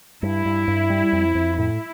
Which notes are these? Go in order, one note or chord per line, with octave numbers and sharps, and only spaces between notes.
G2 E4
G2
G2
G3
F2
F2
A2 E4